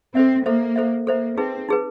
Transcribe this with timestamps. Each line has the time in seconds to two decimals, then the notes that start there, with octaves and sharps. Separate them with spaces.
0.15 C4 A4 C5 E5
0.45 A#3 A4 C5 E5
0.76 A4 C5 E5
1.07 A#3 A4 C5 E5
1.37 C4 D#4 G#4 B4
1.69 D#4 G#4 B4